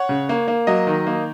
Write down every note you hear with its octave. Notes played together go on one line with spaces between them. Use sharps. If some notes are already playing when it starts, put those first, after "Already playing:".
Already playing: C#5 F#5
C#3
A#3
A#3
F#3 D#5
D#3
A#3